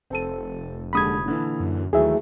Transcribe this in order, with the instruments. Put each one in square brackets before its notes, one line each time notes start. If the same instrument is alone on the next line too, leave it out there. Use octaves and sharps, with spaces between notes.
[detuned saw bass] F1 [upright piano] C4 A4 D#7
[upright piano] D#2 D3 G#3 [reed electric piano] B5 D#6 G#6
[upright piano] A#2 D3 E3
[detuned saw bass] F#2
[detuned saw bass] D#2 [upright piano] E3 F#3 A3 [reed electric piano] G#4 E5